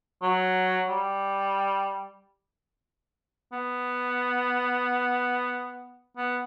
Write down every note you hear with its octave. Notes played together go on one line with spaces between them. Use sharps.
F#3
G3
B3
B3